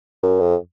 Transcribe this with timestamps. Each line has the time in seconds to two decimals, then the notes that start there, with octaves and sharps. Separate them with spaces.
0.23 F#2
0.40 F2